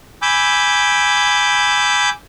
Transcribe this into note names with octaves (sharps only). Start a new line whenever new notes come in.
G#5 B5 D6 E6 G6